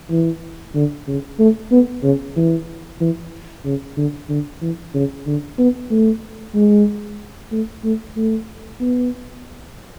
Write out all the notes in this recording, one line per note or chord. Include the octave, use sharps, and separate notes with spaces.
E3
D3
C#3
A3
B3
C#3
E3
E3
C#3
D3
D3
E3
C#3
D3
B3
A3
G#3
A3
A3
A3
B3